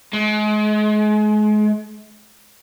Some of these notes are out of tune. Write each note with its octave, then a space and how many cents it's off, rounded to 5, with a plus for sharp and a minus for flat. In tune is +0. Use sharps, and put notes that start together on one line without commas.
G#3 +35